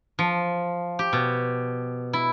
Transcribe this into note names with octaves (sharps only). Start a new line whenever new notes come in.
F3
G4
B2
E4